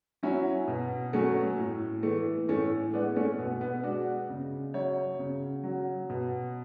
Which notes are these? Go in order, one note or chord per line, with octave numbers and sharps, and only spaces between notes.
F#3 C#4 E4
B2
F#3 A3 C#4
A2
E3 A3
A2 A3 C#4
G#3 B3 D4
A3 C#4
B2 B3
B3
G#3 D4 F#4
C#3
F#3 C#5 E5
C#3
F#3
B2